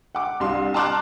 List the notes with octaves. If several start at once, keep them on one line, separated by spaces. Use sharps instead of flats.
F#5 D6
C2 D4 F5 C6
A5 A#5 C6 D6 F6 F#6